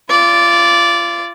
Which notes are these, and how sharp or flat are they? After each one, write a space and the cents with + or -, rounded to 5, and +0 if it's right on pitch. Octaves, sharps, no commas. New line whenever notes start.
F4 -30 D5 -10